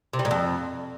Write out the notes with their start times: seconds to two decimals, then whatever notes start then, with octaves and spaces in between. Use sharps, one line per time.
0.13 C3
0.19 G3
0.25 G#2
0.31 F2